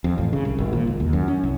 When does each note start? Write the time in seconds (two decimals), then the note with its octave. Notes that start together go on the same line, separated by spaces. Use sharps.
0.04 F2
0.18 A1
0.33 C#3
0.45 C2
0.59 G#1
0.73 A#2
0.87 C#2
1.00 D#2
1.13 F#2
1.28 C#4
1.43 C2